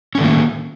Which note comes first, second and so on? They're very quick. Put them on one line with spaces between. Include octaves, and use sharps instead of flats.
C#4 A3 D#3 A#3